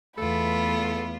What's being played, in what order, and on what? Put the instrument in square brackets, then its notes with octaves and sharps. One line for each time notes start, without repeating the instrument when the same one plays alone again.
[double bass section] E2 [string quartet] A3 B3 F4 [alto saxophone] A4 [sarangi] B5